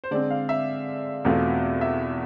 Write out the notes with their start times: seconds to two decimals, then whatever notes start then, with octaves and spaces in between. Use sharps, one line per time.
0.04 C5
0.11 D3 G#3 C4 D5
0.30 F5
0.49 E5
1.25 E2 B2 A3 C4 F4
1.81 E5